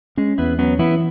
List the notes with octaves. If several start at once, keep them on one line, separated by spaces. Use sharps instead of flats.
G#3 C#4
E2 B3 E4
F#3 B3 C#4
E3 B3 E4